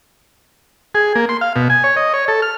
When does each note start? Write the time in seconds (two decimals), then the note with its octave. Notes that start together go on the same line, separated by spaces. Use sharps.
0.95 G#4
1.16 A#3
1.29 C6
1.41 F5
1.56 B2
1.70 G#5
1.84 C#5
1.97 D#5
2.14 C#5
2.28 A4
2.42 F6